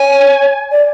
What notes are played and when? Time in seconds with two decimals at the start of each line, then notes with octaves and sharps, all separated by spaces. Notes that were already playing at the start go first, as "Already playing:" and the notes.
Already playing: C#5 G#5
0.71 D5